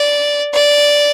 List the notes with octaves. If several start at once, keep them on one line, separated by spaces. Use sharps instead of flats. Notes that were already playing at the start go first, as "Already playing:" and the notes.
Already playing: D5
D5